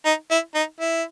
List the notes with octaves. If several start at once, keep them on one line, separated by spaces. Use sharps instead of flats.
D#4
E4
D#4
E4